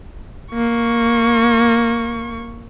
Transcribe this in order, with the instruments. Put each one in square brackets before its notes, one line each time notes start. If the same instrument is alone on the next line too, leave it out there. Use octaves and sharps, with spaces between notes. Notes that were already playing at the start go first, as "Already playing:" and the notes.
[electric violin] A#3 C#6